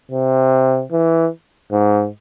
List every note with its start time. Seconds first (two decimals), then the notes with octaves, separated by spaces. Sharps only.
0.11 C3
0.92 E3
1.72 G#2